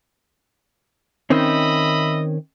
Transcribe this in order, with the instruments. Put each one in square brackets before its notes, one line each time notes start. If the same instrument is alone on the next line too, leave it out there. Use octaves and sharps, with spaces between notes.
[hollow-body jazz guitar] D#3 C4 C#4 [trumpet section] D#5 E5 B5